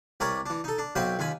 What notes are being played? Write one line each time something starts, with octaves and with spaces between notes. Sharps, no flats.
C2 A#4 B4 C#5 D5 A#5
E3 D4
D#4 A4
D4
B1 F#3 C4 B4 F5 G5
D#2 F4 G#5 B5